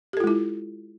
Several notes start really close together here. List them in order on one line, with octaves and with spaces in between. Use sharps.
G4 A4 F4 G#3 E4